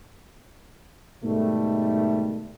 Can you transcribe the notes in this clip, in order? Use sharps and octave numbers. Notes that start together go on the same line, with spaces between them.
G#2 B2 D#3 G3 A3